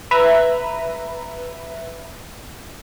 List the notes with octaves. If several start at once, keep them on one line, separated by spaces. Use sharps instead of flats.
B4 E5 A#5